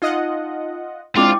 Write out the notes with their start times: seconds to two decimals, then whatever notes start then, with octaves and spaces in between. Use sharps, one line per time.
0.02 D#4 F4 D#5 F#5
1.16 G#3 C4 D4 E4 F4 G5 D6